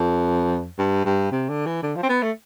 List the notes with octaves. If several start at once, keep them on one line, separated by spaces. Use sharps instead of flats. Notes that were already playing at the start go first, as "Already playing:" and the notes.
Already playing: F2
G2
G2
C3
D3
E3
D3
F3
C4
B3
A3